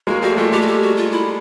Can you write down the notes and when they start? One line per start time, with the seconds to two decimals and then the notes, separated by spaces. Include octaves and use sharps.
0.07 G#3 A#3 F#4
0.22 G3 A3 F#4
0.37 G3 A3 F4
0.52 G3 A3 G4
0.62 F#4
0.67 G4
0.82 F#4
0.97 F4
1.11 E4